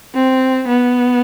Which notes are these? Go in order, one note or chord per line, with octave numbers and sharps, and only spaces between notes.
C4
B3